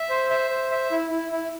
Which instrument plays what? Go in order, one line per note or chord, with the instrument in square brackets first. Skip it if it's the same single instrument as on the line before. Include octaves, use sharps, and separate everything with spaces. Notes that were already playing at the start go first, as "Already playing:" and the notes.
Already playing: [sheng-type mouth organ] E5
C5
E5
C5
E5
E4
E4
E4